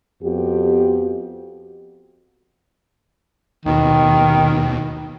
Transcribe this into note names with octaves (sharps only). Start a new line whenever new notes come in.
F2 B3 F#4 G4
D#2 B2 D#3